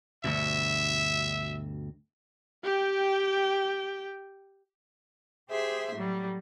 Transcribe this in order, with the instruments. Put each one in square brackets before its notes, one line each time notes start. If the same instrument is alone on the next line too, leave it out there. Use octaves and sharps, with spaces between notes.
[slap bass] D2 G2 B2 [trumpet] E5
[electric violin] G4 G5
[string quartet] G4 G#4 C5 E5 C6
A2 F#3 G3